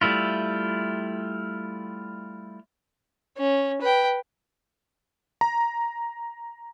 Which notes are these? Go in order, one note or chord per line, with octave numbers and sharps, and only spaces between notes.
G3 A3 E4 F4
C#4
B4 G5
A#5